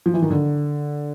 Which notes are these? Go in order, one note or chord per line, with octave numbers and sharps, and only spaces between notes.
F3
E3
D#3
D3